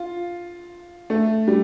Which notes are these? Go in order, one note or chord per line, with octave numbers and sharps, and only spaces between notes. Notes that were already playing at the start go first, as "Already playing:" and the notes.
Already playing: F4
A3
G3